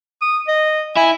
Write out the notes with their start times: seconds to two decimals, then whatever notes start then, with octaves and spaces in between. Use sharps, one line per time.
0.22 D#6
0.48 D#5
0.97 E4 G#5